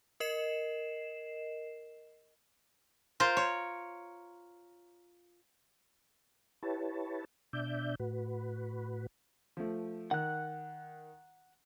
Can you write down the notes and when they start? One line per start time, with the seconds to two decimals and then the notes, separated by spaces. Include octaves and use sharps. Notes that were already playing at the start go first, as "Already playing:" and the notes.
0.20 A#4 D#5 C7 E7
3.20 F4 A#4 C5
3.37 C#5
6.63 E4 G4 B4 C#5 A5
7.53 B2 D4 D5 E5 G6
8.00 A2 F#4 B4
9.57 F3 A3
10.11 D#3 F#5 F#6